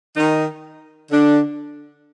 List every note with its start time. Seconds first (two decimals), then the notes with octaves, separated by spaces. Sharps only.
0.16 D#3 D#4
1.11 D3 D4